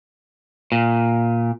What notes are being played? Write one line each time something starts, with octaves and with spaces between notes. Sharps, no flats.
A#2